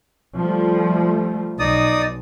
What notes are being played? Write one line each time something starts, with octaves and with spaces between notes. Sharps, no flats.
F3 G3 A3
B1 D#4 D5 D#6